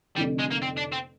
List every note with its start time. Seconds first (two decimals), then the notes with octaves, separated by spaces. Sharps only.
0.16 F1 F2 D3 G3
0.39 G#3
0.51 A#3
0.62 C4
0.77 D4
0.92 C4